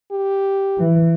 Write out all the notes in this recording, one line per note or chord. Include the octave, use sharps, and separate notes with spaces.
G4
E3